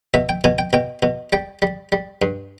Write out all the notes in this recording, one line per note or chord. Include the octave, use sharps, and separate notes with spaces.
B2 E5
G5
B2 G#5
G5
B2 G5
B2
G3 G5
G3
G3
G2